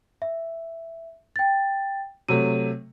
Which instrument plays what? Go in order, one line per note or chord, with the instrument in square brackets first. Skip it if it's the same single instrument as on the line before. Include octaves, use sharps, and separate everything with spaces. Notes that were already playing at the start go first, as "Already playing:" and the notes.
[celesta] E5
G5 A6
[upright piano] C3 F#3 A3 [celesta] D#7